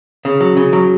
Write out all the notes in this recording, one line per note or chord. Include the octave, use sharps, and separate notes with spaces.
C#3
F#3
C#3
F#3